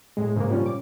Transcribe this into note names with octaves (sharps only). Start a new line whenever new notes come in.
A2 G#3
G#2 C#3 G#3 A#3
A#2 F3 G3 C#4
D6